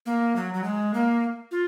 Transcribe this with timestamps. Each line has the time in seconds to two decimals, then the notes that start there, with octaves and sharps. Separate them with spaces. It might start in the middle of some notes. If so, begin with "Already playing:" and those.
0.06 A#3
0.36 F#3
0.54 F#3
0.64 G#3
0.94 A#3
1.51 F4